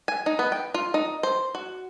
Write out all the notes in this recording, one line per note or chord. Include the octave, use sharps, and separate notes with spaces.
G#5
D#4
B3
G5
F4
D#4
C5
F#4